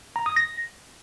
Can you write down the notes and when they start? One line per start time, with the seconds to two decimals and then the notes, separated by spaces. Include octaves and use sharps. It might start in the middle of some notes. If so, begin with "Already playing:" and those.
0.16 A#5
0.26 D#6
0.36 A#6